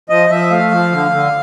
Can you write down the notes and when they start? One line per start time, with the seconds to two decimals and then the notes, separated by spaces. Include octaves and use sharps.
0.10 F3 D#5
0.30 F3 E5
0.51 A3 F5
0.71 F3
0.92 D3
1.12 D3